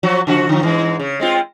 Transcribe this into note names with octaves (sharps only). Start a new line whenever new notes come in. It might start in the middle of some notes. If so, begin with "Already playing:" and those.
F3 F#3 F#4
C#3 F3 F#4
D3 F3
G#2 E3 G#3
C#3
G#3 C4 F4